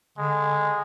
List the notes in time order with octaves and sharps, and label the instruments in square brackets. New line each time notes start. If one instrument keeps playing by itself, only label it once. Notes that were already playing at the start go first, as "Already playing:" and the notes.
[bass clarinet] D3 [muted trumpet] G#3